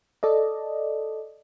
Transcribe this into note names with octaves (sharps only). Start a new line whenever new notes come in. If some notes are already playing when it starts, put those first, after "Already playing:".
A4 D5 D#5